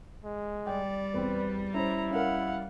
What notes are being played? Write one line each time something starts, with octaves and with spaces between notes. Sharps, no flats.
G#3
G3 D5 G5
E2 C4 B4
C#4 E4 C5 A#5
C#4 A#4 F5 F#5